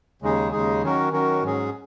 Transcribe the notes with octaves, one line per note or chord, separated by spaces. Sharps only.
D#2 C#3 G#3 D#4 G#4
D#2 C#3 G#3 D#4 G#4
D#3 F#3 C#4 F#4 A#4
D#3 F#3 C#4 F#4 A#4
G#2 F#3 C#4 G#4